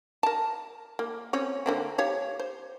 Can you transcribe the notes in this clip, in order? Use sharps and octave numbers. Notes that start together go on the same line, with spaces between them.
A#4 A5
A#3
C4 C#4 C#5
D3 A#3 C4
G4 C#5 F5
C5